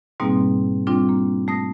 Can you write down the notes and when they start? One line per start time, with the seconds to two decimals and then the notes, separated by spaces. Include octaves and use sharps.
0.20 G#2 B2 G3 A#3 C4 D#4
0.87 G3 C4 D4 F4
1.09 A#3
1.48 A3 D#6 A#6